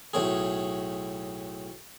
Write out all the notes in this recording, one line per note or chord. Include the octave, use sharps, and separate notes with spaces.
B1 A2 G#4